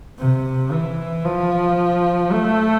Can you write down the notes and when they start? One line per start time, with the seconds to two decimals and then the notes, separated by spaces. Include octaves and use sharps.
0.19 C3
0.72 E3
1.25 F3
2.32 A3